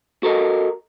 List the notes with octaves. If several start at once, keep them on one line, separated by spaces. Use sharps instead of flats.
F#4 A4 A#4 D#5